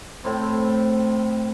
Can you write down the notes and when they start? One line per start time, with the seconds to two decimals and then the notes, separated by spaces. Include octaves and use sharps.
0.24 A2 C4